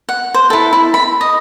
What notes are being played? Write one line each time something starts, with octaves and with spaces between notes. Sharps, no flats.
F#5
C5
E4 A4
E4
B5
D#5